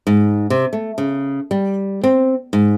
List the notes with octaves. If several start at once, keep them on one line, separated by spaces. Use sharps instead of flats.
G#2
C3
A3
C#3
G3
C4
G#2